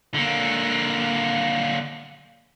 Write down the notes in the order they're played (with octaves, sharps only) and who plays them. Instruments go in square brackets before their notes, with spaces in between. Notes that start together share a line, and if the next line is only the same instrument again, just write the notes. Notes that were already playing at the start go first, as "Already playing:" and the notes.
[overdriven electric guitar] D3 A#3